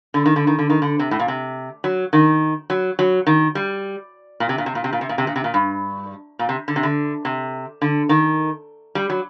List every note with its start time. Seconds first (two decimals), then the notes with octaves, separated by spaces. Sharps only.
0.14 D3
0.26 D#3
0.36 D3
0.47 D#3
0.58 D3
0.70 D#3
0.82 D3
0.99 C3
1.11 A2
1.19 A#2
1.28 C3
1.84 F#3
2.13 D#3
2.70 F#3
2.99 F#3
3.27 D#3
3.55 G3
4.40 A#2
4.49 C3
4.58 A#2
4.66 C3
4.75 A#2
4.84 C3
4.93 A#2
5.01 C3
5.09 A#2
5.18 C3
5.27 A#2
5.36 C3
5.44 A#2
5.54 G2
6.39 A#2
6.49 C3
6.68 D3
6.76 C3
6.83 D3
7.25 C3
7.82 D3
8.09 D#3
8.95 G3
9.10 F#3